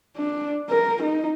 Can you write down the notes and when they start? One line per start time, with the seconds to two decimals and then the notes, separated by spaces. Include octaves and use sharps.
0.17 D4
0.70 A#4
1.03 D#4